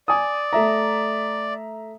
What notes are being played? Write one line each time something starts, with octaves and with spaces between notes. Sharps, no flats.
D5 G#5 D#6
A3 E5 A#5